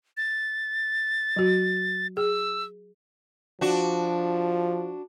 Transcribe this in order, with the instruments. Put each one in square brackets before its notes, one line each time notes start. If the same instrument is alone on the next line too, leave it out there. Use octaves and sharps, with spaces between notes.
[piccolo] A6
[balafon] F#3 F#4
[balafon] G#4 [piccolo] E6
[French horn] F3 [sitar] D4 F#4